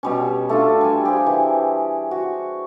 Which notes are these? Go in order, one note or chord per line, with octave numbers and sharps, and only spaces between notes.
B2 G3 C#4
A3 D4 F4
G3 G#5
G4 G#4 C5
E3
F#4